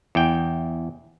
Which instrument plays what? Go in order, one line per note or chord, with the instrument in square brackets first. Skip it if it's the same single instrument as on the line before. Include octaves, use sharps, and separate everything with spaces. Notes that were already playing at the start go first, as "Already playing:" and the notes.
[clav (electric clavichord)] E2 G5